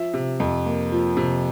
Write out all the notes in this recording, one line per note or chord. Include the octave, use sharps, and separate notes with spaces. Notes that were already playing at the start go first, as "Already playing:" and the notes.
Already playing: F3 E5
C3
F2
A#3
F3
C3